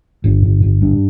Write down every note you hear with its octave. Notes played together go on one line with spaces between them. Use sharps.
G1
G1
G1
G2